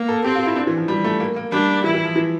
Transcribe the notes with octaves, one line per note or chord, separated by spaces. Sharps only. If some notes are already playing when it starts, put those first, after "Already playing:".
Already playing: A#3
A4
C4 G4
F4
E4
D4
E3
F3
G3
A3
A#3
A#3
G3 D4
E3 E4
E3
F3
E3